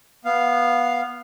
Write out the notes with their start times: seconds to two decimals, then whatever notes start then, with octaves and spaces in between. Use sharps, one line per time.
0.25 B3 F5